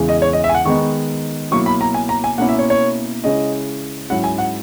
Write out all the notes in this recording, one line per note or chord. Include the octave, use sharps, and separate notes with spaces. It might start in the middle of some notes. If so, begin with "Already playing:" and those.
Already playing: E2 C#3 E3 G#3
D#5
C#5
D#5
E5
G#5
F#5
D#3 G#3 B3 D#4 C#6
B2 F#3 A#3 E4 C#6
B5
A#5
G#5
A#5
G#5
B2 A#3 C#4 E4 F#5
E5
C#5
C#5
C#3 G#3 C#4 E4 D#5
G#2 F#3 C#4 E4 F#5
G#5
F#5